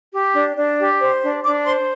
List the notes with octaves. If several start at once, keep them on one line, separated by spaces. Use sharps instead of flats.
G4
D4
D4
G4
C5
D4
D4 D6
C5 C6